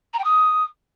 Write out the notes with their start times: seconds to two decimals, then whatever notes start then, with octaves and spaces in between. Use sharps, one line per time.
0.13 A#5
0.19 G5
0.24 D#6